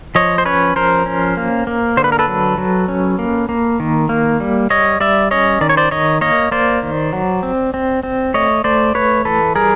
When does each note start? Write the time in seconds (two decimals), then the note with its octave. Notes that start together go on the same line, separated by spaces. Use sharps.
0.15 F3 C#5 D#5
0.38 C5
0.45 C#4 B4 C#5
0.76 F3 A#4 C5
1.06 C#4
1.37 A#3
1.67 A#3
1.97 D3 C5
2.04 B4
2.12 A#4
2.19 A4 B4
2.28 F#3
2.58 F#3
2.88 C#4
3.19 A#3
3.49 A#3
3.80 D#3
4.09 A#3
4.40 G3
4.70 G3 C#5 D#5
5.00 G3 D5 E5
5.31 C#4 C#5 D#5
5.61 D#3 D5
5.69 C#5
5.77 C5 D5
5.91 D#3 C#5 D#5
6.21 A#3 C#5 D#5
6.51 A#3 C5 D5
6.83 D#3
7.13 F#3
7.43 C4
7.74 C4
8.03 C4
8.34 A3 C#5 D#5
8.64 A3 C5 D5
8.95 A3 B4 C#5
9.25 E3 A4 B4
9.55 G3 G#4 A#4